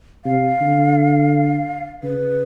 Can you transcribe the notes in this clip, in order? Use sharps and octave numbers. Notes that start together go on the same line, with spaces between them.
C3 F5
D3
C#3 B4